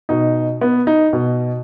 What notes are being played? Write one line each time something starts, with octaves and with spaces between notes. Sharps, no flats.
B2 D#4
B3
D#4
B2